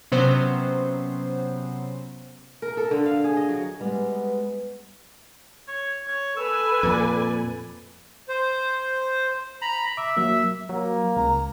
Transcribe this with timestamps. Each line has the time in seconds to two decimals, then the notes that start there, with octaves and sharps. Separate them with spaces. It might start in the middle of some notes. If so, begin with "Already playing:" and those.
0.12 C3 F#3 B3 C#4 C5
2.62 A#4
2.77 A4
2.91 D3
3.06 F5
3.24 G#4
3.37 D#5
3.49 F#3
3.81 G3 G#3 B3
5.68 C#5
6.08 C#5
6.37 A4 B4 G#5 E6
6.83 F2 A#2 D5
8.29 C5
9.62 A#5 B5
9.97 E5 D6
10.17 F#3 A#3 E5
10.69 F#3 A#3
11.16 C#2 A#5